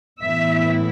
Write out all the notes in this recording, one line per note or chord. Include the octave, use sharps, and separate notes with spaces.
A2 E3 B3 E4 E5